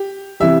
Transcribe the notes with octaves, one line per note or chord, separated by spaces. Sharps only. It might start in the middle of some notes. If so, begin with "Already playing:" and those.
Already playing: G4
C3 E3 G3 E5